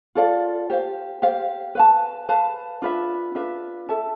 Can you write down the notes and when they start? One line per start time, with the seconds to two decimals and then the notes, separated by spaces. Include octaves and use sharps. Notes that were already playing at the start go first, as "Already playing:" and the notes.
0.15 F4 A4 D5 F5
0.70 G4 C5 F5
1.22 G4 C5 F5
1.75 B4 F5 A5
2.29 B4 F5 A5
2.82 D4 F4 B4 E5
3.35 D4 F4 B4 E5
3.89 A4 E5 A5